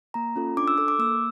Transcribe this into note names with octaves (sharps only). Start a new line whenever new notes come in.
A#3 A#5
C#4 F4 A4
D4 D6
E6
A4 D6
D6
A#3 E6